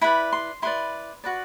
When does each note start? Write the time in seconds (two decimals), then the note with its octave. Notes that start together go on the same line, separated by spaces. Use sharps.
0.01 E4 B4 D5 B5
0.33 C6
0.62 E4 B4 D5 C6
1.24 F#4 B4 D5